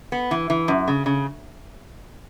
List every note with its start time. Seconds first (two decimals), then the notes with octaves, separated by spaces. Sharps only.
0.12 B3
0.31 E3
0.50 E3
0.68 F#2
0.88 C#3
1.06 C#3